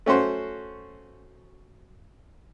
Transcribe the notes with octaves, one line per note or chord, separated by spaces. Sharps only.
A3 C#4 F#4 C5